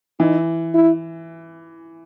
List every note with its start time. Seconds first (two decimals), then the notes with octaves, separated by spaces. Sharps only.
0.20 E3 D#4
0.74 E4